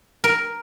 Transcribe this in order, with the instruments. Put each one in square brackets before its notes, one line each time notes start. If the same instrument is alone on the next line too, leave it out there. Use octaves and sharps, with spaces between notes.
[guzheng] A#4